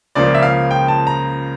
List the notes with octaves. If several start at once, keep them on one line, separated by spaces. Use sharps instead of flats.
C#2 C#3 F3 A#3 D5
E5
F5
G5
A5
A#5